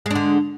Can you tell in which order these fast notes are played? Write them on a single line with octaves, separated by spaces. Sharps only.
G#3 D4 D3